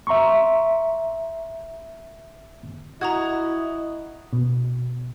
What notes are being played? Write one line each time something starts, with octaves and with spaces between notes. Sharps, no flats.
E5 A#5 C6 C#6
E4 F#4 D#5 A#5 D#6 G#6
B2